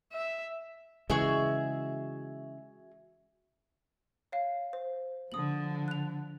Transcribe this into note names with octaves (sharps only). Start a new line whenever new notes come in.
E5
C#3 E3 G#3 F#4 G#4 E5
C#5 F5
C5
D3 F3 D#6 F#7
F#6 F7